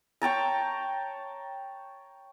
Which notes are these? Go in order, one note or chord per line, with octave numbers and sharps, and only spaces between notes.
C#5 G5 A5 A#5